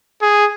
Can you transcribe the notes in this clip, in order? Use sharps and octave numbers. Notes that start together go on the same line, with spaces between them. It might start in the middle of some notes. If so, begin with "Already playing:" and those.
G#4